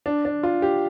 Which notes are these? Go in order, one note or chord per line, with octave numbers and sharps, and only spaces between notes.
D4
D4
F4
G4